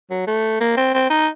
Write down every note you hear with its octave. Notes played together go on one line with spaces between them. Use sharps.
F#3
A3
A#3
C4
C4
D#4